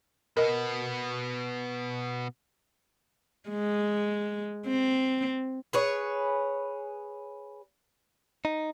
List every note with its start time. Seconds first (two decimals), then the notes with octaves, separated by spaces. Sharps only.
0.37 B2 B3 A#4 D#5
3.50 G#3
4.67 C4
5.73 G#4 B4 C#5
8.45 D#4